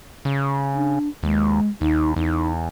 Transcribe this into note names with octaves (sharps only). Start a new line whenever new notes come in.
C#3
D4
D#2 G#3
D#2 D#4
E2 D#4